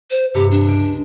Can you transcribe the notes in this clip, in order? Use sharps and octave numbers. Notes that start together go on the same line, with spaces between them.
C5
G2 C3 G4 C#7
D4
C#2 D7